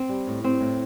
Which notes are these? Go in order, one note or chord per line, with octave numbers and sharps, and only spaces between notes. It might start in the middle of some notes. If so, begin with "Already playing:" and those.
Already playing: C4
G3
A2
G3 C4
A2